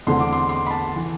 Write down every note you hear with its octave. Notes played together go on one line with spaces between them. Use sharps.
E2 D3 A3 C4 C6
D6
C6
C6
B5
A5
E3